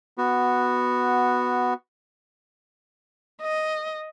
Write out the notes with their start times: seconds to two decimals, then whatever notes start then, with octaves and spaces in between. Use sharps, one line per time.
0.18 B3 F#4
3.42 D#5